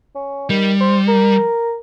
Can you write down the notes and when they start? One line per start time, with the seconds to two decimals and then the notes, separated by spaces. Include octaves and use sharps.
0.15 C#4
0.50 D#3 G3
0.81 C5
1.08 A#4